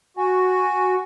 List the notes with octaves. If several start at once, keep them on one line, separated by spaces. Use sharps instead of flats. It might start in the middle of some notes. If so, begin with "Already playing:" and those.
F#4 G#5